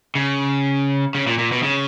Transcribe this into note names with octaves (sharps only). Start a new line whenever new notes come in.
C#3
C#3
A#2
A#2
B2
C#3